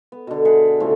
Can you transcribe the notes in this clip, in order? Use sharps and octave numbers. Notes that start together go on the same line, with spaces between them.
B3
B2 D3
G#4 B4 E5 F#5
A2 C#3 F3 A3